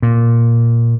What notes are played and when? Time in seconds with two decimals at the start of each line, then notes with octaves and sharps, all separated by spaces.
0.02 A#2